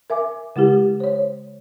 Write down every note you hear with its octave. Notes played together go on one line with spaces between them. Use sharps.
A#4 E5 G#5 D6
C#3 G#3 E4 G4
C5 C#5